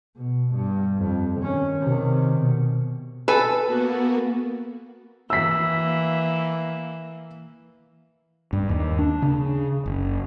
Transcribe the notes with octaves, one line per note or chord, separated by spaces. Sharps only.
B2
G2
F2
D#3 C#4
C3 D#3
B2
A4 B4 G#5
A#3 B3 F#4
E3 A#3 E6 B6
G2
D#2
D4
C#3
F#1